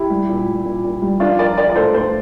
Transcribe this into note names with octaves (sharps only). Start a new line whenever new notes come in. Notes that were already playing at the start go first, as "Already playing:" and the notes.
Already playing: E4 G4
G3
A#2
G3
A#2
A#2
G3
F3 D4 F4
F3 A#4 D5
F3 A#4 D5
D5
A2 A4 C5
A2 A4 C5